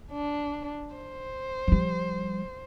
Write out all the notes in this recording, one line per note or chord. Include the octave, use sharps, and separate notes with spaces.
D4
C5
F3 G3